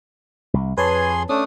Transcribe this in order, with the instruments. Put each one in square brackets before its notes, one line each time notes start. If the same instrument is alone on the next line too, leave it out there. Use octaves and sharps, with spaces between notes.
[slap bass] C2
[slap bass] F2 [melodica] G#4 G#5 C6 [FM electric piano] B4 C#5 A5
[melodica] A3 D4 D#6 [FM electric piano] C#4